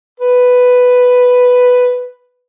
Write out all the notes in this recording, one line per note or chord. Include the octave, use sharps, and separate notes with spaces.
B4